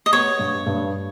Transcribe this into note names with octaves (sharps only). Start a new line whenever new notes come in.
D#5
B3 C#5
G2
G2